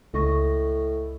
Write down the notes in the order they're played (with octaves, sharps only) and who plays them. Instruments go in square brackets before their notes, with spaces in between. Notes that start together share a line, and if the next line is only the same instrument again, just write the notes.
[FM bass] C#2 [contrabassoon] A2 [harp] D#5 C#6 A#6